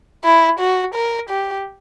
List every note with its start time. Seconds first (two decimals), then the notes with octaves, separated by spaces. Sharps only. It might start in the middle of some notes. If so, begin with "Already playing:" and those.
0.24 E4
0.59 F#4
0.94 A#4
1.30 G4